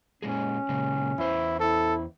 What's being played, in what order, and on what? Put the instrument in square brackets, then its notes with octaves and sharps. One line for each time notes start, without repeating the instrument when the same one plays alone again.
[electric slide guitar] A#2 G#3 G#4 [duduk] C#4
[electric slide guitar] A#2 C#3 G#3
[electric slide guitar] E2 C5 [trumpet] E4
[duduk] E4 [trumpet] A4